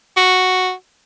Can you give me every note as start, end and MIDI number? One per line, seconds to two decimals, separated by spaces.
0.17 0.72 66